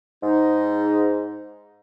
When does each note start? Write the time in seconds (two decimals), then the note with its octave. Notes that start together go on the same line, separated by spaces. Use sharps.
0.22 G#2 D#4